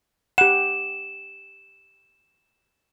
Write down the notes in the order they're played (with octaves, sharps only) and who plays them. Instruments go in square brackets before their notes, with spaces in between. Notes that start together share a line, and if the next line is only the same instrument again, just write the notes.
[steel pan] G4 F#5 [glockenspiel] E7